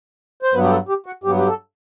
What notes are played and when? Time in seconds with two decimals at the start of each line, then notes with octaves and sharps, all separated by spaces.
0.43 C5
0.53 G2 F#3 B3 B4
0.64 G4
0.71 A4
0.89 G4
1.06 F#4
1.24 G2 F#3 B3 G4
1.38 G4
1.47 A4